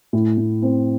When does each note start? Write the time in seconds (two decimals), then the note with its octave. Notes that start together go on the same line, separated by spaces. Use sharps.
0.13 A2
0.38 A2
0.62 C4